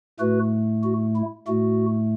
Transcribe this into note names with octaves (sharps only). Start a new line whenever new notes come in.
A2 A3 F#4 B4
F#4
E4
A2 A3 F#4